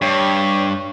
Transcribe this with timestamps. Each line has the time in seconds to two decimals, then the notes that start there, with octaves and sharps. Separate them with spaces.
0.02 G2 C#5